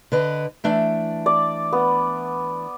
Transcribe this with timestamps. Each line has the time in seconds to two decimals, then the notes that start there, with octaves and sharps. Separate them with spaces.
0.12 D3 B4 D#5
0.64 E3 A3 D4
1.26 D5
1.73 B3